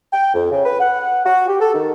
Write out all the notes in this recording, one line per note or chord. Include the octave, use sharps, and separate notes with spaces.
G5
F2
C#3
B4
F#5
F#4
G4
A4
D#3